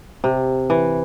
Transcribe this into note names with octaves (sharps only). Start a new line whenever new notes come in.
C3
E3